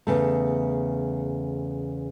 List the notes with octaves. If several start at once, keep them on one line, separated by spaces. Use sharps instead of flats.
E2 C#3 A3